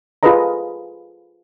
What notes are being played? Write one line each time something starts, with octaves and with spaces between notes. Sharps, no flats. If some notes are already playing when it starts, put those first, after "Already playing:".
F4 G#4 A4 B4 D#5 A#5